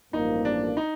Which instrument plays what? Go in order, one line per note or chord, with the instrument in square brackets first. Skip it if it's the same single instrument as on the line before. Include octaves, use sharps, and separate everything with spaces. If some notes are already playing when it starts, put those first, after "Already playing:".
[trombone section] A1 G2 F3 A#3 [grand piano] D#4
[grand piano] D4
D#4